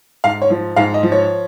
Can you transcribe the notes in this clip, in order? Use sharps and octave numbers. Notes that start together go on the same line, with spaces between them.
G#2 F5
C#5
F3
G#2 F5
D#5
F3
C#5